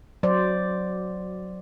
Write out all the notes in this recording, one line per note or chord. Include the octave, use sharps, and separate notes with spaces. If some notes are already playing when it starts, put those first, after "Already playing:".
F#3 C5 D5